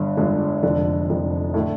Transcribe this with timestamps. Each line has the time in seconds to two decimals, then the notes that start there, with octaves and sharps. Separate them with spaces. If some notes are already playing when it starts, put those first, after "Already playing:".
Already playing: G1 G2 D3
0.17 G1 G2 D3 G#3
0.63 F1 F2 D3
1.09 F1 F2 D3
1.54 A2 D3 A3